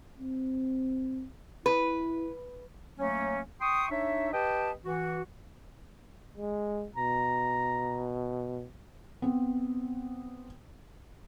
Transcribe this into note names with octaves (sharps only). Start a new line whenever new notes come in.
C4
E4 B4
F#3 A3 A#3 C#4
G5 C6 C#6 D#6
D4 D#4 C#5 E5
G4 B4 D#5 G5 A5
E3 F#4
G#3
B2 A#5
B3 C4